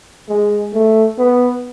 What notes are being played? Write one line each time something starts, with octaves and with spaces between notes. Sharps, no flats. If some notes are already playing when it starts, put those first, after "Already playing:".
G#3
A3
B3